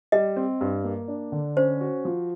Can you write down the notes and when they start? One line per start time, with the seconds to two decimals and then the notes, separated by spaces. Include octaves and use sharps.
0.12 G3 D#5
0.36 C4
0.61 G2
0.84 A#3
1.08 D4
1.32 D3
1.57 C#4 C5
1.81 F#4
2.05 F3